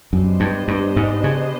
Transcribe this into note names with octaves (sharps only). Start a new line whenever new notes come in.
F#2 B3 D4 G4 C5 D#5
G2
G2
G#2
C#3